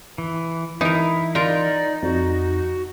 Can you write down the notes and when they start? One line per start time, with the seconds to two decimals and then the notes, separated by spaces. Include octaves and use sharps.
0.18 E3
0.81 E3 D#4 E4 A#4
1.35 D#4 F4 A#4 D5
2.03 F2 F#4